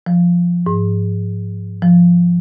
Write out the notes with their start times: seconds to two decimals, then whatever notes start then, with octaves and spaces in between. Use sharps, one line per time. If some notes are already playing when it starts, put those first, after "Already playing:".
0.06 F3
0.67 G#2
1.82 F3